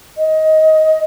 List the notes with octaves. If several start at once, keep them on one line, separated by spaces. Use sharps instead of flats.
D#5